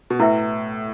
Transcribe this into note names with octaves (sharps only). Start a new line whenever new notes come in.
B2
A2 E4 B4 E5 G5